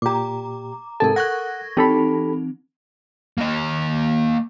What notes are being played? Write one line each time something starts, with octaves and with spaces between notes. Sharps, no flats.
A#2 G4 A#5 D6
G#2 C3 A4 A#4 A5
F#5 C#6 F#6 G#6 A#6
E3 C4 D#4 G4 A4 B5
A#3 D#5